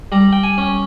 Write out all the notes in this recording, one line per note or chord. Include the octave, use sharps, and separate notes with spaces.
G3 A#5
G5
G#5
C#4